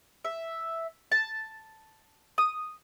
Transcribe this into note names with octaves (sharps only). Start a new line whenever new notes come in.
E5
A5
D#6